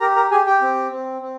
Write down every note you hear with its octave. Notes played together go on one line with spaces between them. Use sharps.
G4 A#4 A#5
A#4 A#5
G4 G#4 G#5
G4 G5
C4
C4
C4